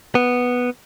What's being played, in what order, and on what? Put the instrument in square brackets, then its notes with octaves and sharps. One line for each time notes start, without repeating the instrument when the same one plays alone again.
[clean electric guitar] B3